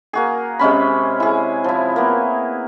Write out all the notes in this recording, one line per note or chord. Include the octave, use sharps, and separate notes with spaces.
A#3 F#4 G#4
C3 G#3 C#4 B5
E4 G#4
F3 E4
A#3 B3